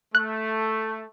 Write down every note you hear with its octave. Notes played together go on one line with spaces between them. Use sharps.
A3 F#6